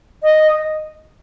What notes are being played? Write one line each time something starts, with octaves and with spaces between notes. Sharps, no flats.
D#5